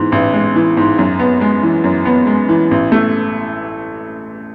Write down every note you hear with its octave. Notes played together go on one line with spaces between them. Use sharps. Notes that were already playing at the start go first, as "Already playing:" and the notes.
Already playing: G#2 E3
A1
G#3
E3
G#2
F#2
B3
G#3
E3
F#2
B3
G#3
E3
A1
A3